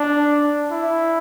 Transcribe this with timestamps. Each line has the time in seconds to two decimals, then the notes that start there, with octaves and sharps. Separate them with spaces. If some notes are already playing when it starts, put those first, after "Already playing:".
Already playing: D4
0.71 E4